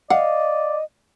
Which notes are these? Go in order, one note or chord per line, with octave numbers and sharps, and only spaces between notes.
D5 D#5 F5 F#5